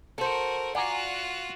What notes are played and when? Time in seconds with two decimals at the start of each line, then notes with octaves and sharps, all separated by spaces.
0.18 F#4 A4 A#4 C5
0.75 F4 F#4 D5 F#5 G#5 A#5